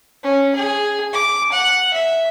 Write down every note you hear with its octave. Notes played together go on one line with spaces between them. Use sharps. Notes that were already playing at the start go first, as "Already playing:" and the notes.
C#4
G#4
D6
F#5
E5